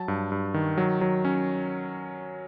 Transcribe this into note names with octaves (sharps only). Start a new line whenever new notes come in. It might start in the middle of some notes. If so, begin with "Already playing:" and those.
Already playing: F#3 A5
G2
G2
D#3
F#3
F#3
C#4